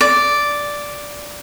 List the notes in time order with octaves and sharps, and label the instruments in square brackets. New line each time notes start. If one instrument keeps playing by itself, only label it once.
[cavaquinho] D5